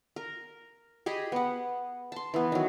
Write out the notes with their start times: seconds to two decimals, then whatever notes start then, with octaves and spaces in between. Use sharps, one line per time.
0.16 A#4
1.06 G4 G#4 D#5 B5
1.32 B3 F#5
2.12 A5 C6
2.34 E3 B3
2.52 D#3 F#3